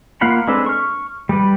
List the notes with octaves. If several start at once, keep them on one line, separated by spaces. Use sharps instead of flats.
A#3 F4 F5 F#5 B5
G#3 C4 D4 A4 B4
C#6 F6
G3 G4 B4